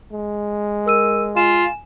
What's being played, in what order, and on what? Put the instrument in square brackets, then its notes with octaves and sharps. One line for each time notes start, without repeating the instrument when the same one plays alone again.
[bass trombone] G#3
[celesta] A#4 E6 D#7
[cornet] F4 [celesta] G#5 E7